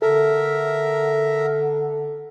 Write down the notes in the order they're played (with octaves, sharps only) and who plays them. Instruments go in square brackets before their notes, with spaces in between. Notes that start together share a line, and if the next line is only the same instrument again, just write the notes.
[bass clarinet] D3 [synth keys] A4 [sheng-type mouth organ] A#4 E5